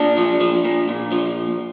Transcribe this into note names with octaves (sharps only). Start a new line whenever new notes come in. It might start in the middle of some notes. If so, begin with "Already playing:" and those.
Already playing: A#2 D4
F3
F3
A#2
A#2
F3